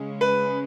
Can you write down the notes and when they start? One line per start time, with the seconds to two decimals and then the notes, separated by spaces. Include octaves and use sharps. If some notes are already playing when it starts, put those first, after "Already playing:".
Already playing: C#3 G#3 C#4
0.21 B4